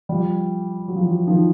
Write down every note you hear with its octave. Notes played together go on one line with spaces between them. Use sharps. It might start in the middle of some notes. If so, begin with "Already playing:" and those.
F3 G3
F#3
F3
E3 F#3
D#3 F3